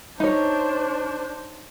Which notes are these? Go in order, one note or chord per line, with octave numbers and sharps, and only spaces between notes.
D4 D#4 C5 C#5